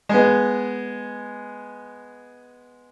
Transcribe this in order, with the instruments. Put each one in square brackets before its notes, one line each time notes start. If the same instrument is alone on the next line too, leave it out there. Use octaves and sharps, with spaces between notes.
[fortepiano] G#3 B3